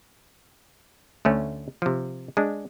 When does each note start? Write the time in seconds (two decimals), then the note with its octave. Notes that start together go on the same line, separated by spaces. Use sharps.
1.25 D2 A3 C#4
1.82 C3 F3
2.37 G#3 D4